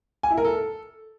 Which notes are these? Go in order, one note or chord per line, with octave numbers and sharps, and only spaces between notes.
G#5
E4
A#4
A4